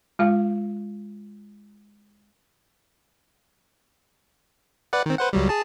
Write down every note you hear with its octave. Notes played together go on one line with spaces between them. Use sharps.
G#3 F4 F5
B4 D5 F#5
D#3 C4
B4 C5 F#5
C#2 F#3 G3
G#4 A5